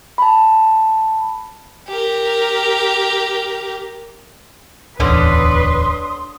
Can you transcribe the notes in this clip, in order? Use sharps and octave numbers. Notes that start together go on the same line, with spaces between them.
A5 B5
G4 A#4
D1 E2 D3 C#4 B4 C6 D#6